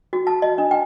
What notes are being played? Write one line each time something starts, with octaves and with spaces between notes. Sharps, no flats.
F#4
A5
D#5
D4
G5